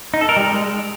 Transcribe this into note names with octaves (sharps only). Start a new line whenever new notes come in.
D#4
A4
A#4
G3
G#3